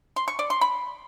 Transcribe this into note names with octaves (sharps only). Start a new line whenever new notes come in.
C6
C#6
D5
C6
B5